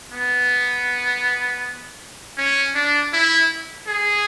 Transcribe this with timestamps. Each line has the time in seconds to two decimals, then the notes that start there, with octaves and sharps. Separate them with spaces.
0.12 B3
2.37 C#4
2.75 D4
3.13 E4
3.87 G#4